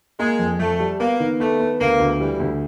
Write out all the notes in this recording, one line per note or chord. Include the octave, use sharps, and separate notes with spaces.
G#3 A#3
F2
F2 A3
G3
A#3 B3
D#3
A3 B3
B3
D2 A#3
D2
E3 G3
D2